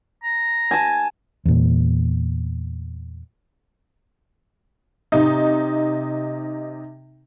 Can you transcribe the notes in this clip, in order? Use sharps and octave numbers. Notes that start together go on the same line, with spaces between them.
A#5
G#5 A5
E2 A#2
C3 D#4